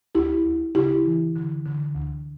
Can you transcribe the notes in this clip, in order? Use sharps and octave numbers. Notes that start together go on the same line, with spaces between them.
D2 E4 G4
D2
C#3 E4 G4
E3
D3
D3
D2